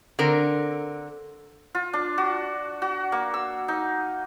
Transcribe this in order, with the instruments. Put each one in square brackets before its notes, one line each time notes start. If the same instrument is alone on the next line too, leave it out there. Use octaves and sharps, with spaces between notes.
[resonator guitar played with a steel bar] D3 C4 A#4
[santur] F4
D4
F#4
F#4
A#3
E6
D#4